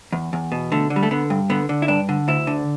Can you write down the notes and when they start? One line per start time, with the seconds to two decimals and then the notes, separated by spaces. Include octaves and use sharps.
0.12 E2
0.33 E2
0.52 B2
0.72 D3 A3
0.90 D3
0.96 G3
1.03 A3
1.11 D3 B3
1.30 G2
1.50 D3 B3
1.69 D3
1.82 E4
1.88 G2 D4
2.09 D3
2.28 D2 E4
2.47 D3